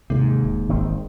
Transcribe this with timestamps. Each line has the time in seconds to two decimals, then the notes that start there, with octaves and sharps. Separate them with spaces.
0.10 D#2 G#2 C3
0.44 E1
0.69 G#1 D#3 C4